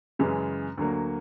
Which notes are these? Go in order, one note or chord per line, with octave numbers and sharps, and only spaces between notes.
F#2 C#3 E3 G#3
D2 D3 F#3 A#3